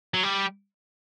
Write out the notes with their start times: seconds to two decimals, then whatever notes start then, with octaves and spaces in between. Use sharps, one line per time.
0.14 F#3
0.23 G3